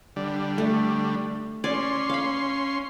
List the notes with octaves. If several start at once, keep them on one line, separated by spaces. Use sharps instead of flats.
D3 G3
A3
C#4 D5 G#5 C6
F5 B5